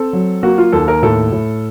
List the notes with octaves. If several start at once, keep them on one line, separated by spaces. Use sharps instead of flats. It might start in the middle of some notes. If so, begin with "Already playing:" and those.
Already playing: C4 A4
F#3
A#3 F#4
F4
D#2 A4
A#4
A2 A4
A2